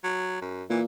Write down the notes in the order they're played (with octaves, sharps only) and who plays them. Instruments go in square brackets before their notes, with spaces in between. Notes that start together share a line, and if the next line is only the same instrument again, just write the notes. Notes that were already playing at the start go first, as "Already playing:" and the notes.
[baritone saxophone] F#3
F#2
[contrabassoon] A#2 [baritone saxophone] E3